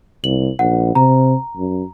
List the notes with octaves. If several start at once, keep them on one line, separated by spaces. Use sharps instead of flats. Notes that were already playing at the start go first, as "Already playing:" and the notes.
C2 F#7
A#1 F#5
C3 A#5
F#2